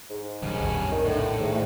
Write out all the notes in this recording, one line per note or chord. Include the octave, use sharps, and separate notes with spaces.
G#2
G2 B2 D#3 C#4
B1 F2 A#2
D#3
A2 D3
G#2 D#3